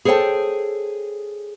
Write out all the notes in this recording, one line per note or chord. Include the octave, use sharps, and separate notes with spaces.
G#4 A4 C5 C#5 G5 A5